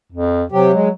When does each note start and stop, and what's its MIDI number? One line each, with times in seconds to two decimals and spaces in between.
0.12 0.44 41
0.52 0.72 48
0.52 0.91 54
0.52 0.72 67
0.73 0.88 56